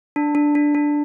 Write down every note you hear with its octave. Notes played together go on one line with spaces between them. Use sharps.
D4
D4
D4
D4